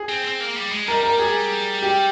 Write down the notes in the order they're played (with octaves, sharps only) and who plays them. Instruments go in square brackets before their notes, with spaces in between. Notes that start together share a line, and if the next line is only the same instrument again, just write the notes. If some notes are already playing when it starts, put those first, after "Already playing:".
Already playing: [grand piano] G#4
[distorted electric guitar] C4
C4
A#3
G3
G#3
[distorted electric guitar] G3 [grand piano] A#4
[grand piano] A#4
G#4
G4